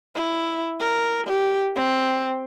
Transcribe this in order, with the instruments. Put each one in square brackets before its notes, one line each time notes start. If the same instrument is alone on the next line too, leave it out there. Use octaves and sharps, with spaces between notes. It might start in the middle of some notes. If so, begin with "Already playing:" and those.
[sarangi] E4
A#4
G4
C4